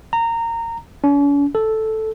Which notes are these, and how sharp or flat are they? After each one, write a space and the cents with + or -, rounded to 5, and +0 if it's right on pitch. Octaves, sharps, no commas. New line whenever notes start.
A#5 -20
C#4 +45
A4 -5